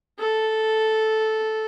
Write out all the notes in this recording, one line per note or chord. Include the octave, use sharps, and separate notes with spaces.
A4